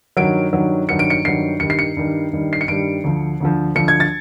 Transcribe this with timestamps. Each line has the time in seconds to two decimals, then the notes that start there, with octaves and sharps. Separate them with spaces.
0.17 G2 D#3 F#3 D7
0.53 G2 D#3 F#3
0.89 G2 D#3 F#3 C#7
0.99 D7
1.10 C#7
1.25 G2 D#3 F#3 C7
1.60 G2 D#3 G3 C#7
1.70 C7
1.79 C#7
1.97 G2 D#3 G3
2.33 G2 D#3 G3
2.53 C7
2.61 C#7
2.68 G2 D#3 G3 D7
3.04 D2 D3 F3
3.40 D2 D3 F3
3.75 D2 D3 F3 C#7
3.88 G#6
4.00 A6